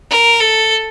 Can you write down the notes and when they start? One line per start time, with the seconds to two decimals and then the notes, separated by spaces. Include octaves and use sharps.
0.11 A#4
0.41 A4